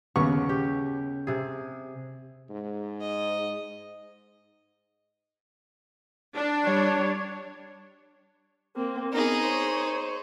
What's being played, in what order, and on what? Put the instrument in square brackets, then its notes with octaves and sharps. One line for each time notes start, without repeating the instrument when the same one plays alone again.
[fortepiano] D#2 B3 C#6 [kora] C#3
[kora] G4
C3 G#4
[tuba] G#2
[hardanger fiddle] D#5
[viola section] D4
[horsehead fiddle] G3 C#5
[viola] A#3 C4
[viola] B3 A#4 [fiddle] D#4 G#4
[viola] C5 C#5